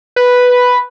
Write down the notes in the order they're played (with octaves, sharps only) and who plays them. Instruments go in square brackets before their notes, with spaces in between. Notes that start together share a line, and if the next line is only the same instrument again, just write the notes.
[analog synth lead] B4